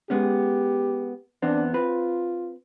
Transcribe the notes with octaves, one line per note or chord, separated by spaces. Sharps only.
G#3 B3 C#4 G4
E2 B3 C4 D4
C4 F4 B4